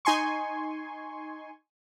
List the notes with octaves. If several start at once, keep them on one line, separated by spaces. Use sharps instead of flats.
D#4 G#5 C6 C#6